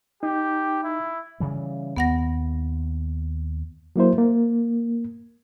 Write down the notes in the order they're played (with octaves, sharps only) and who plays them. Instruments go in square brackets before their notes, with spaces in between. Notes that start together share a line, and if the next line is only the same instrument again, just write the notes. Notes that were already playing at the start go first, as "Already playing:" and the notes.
[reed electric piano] D#4 [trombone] G4
[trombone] E4
[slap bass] C#3 E3 G3
[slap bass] D#2 [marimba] B3 F#5 A#6
[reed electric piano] F#3 A#3 E4 C5
A#3